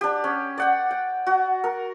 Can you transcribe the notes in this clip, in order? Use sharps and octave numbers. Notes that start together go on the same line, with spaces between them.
D4 G4
C#4
D5 F#5 G5
G5
F#4
A#4